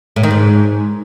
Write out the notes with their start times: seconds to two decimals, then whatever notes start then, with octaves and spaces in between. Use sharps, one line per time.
0.16 A2
0.23 D#3
0.31 G#2